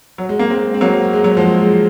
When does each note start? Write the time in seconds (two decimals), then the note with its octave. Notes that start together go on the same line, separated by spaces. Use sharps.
0.18 F#3
0.29 G#3
0.39 A#3
0.50 G#3 C4
0.74 C4
0.81 F#3 A#3
1.13 G#3
1.24 F#3
1.37 F3 G#3